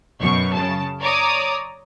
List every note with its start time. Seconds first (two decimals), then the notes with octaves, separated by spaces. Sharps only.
0.20 F#2 B2 C#6
0.52 C#3 A5
1.01 C#5 D5 A#5 D6 D#6